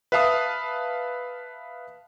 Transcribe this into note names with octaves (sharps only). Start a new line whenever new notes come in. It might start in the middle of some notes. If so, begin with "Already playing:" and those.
B4 E5 F5 A5 D#6